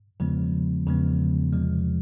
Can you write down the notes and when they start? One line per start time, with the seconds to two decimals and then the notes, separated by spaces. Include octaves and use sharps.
0.20 E2 C#3 F3 G#3 B3
0.87 E2 C#3 F3 G#3 B3
1.52 E2 C3 F3 G#3